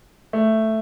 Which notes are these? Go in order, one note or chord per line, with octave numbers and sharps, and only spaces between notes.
A3